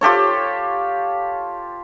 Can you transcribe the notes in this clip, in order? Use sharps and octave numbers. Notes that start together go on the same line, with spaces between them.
F4 G4 A4 C#5